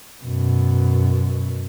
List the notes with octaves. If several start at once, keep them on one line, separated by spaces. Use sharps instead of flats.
F#2 B2